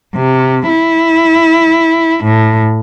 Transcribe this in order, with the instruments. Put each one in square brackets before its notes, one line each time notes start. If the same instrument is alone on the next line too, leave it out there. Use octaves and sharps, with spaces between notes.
[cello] C3
E4
A2